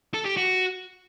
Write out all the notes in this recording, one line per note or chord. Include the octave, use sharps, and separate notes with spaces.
A4
G4
F#4